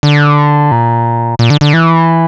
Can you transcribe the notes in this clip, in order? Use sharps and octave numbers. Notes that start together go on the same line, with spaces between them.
D3
A#2
A#2
D3
D3
E3